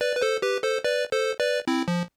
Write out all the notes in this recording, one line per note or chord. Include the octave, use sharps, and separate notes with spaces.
B4 D5
B4
A4 C5
G4 B4
A4 C5
B4 D5
A4 C5
B4 D5
C4 E4
F3